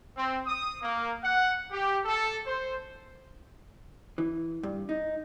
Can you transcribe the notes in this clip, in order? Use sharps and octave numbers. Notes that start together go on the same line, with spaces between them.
C4
D#6
A#3
F#5
G4
A4
C5
E3
G2
D#4